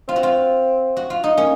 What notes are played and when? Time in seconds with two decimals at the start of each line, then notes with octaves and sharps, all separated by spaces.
0.08 C4 F4
0.16 F#4
0.23 F4
0.97 F#4
1.10 F4
1.24 D#4
1.37 A#3 C#4